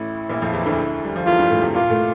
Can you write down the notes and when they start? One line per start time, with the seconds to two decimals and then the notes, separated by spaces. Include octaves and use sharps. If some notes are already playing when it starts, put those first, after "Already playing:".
Already playing: A1 A2 E4
0.29 A#1 A#2
0.42 F2 F3
0.53 E2 E3
0.66 D2 D3
1.04 G3
1.16 F3
1.26 E2 E3 F4
1.38 G2 G3
1.50 A2 A3
1.62 C3 C4
1.74 A#2 A#3 F4
1.90 A2 A3